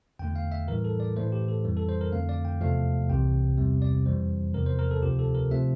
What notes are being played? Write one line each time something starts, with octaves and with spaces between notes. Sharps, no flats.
E2 D3 A3 G5
F5
E5
A2 E3 G3 A#4
A4
D5
A2 E3 A3 C5
G4
A4
F2 E3 G3
A4
C5
A#4
F2 D3 A3 F5
D5
G5
E2 C3 F3 A3 F5
C2 C3 E3 G5
E2 C3 G3
D5
F2 E3 G3 C5
E2 C3 F3 A#4
C5
A#4
A4
D2 C3 F3 G4
A4
A#4
C3 F3 A3 E5